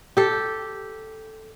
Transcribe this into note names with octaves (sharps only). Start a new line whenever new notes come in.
G4 A4